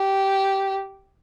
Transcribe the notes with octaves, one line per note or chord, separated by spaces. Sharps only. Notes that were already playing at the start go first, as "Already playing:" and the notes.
Already playing: G4